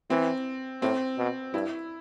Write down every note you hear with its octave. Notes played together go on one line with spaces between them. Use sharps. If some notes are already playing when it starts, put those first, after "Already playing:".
E3 C4
A2 C4
B2
G2 E4